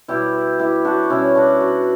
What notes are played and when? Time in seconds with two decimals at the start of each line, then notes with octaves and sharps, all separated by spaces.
0.08 B2 G3 E4 G4
0.59 E4 G4
0.85 D4 F#4
1.10 B2 G3 C#4 E4
1.35 D4 F#4
1.60 D4 F#4